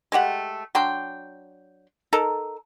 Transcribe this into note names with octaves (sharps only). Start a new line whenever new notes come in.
G#3 A3 G4 F#5
F#3 D4 G5 C6
D#4 A4 A#4